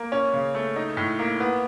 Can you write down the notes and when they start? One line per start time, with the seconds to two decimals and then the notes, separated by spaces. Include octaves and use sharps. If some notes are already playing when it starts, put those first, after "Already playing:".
Already playing: A#3
0.12 C#4
0.33 C#3
0.55 A3
0.76 D#4
0.97 A2
1.19 A#3
1.40 B3